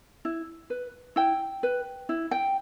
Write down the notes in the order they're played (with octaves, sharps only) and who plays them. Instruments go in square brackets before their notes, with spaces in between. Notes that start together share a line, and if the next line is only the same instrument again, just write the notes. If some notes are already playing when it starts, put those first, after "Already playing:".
[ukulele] E4
B4
E4 G5
B4
E4
G5